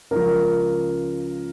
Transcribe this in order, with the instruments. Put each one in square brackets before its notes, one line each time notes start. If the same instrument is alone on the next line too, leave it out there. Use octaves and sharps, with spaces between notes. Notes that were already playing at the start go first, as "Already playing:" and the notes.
[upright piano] C#2 C#3 F3 A#4